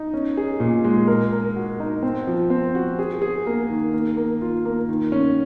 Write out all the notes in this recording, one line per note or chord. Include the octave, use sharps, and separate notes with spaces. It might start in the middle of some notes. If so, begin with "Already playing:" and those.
Already playing: D#4
C#4
G#4
A#2
G#3
A#4
A#4
F#4
D#4
C4
F3
C4
F#4
G#4
G#4
A#3
D#3
A#3
A#3
F4
A#3
D#3
C#4